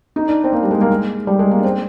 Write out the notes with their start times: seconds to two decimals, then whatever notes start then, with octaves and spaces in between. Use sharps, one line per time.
0.16 D#4
0.28 D4
0.44 C4
0.53 A#3
0.63 G3
0.71 G#3
0.81 A#3
0.91 G#3
1.27 G3
1.39 G#3
1.51 A#3
1.59 D4
1.64 C4